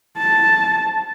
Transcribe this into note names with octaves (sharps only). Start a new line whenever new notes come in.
A5